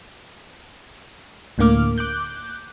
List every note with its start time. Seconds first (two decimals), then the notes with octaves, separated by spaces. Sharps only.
1.58 D2 A2 D3 A#3 D6 F6
1.98 D6 F#6 G6